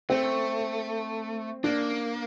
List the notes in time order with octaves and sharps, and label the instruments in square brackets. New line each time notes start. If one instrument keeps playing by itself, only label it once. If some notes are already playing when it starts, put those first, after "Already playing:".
[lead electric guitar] A3 [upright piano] C4
[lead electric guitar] A#3 [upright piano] D4